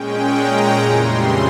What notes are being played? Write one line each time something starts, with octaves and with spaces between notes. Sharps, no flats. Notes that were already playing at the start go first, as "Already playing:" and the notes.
Already playing: A#2 G#3 C#4 G5
A#5
F2 C#3 E3 G3 C6